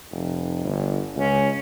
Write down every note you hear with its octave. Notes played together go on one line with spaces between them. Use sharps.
F1
G1
C#2 C#4